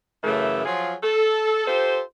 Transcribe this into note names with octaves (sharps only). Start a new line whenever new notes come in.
F#2 C#3 E3 A3
F3 F#3 F4 G#4
A4
F4 G4 A4 C5